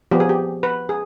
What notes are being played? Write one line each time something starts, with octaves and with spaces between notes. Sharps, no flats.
F3 B3 G4
G#4
G4
B4
G#4